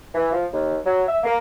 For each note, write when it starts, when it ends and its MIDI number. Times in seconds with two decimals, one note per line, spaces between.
0.15 0.28 52
0.33 0.45 53
0.53 0.77 39
0.85 1.03 54
1.08 1.17 76
1.23 1.35 58